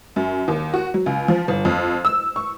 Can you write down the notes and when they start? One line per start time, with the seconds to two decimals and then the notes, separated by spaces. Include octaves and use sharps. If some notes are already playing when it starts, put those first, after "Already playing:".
0.16 F#2
0.48 D#2
0.74 F#4
0.94 F#3
1.06 C#2
1.28 F3
1.48 G1
1.65 F2
2.05 E6
2.36 C#6